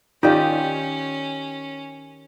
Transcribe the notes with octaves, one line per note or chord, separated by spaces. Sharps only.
D#3 C#4 D#4 F4 G4 D5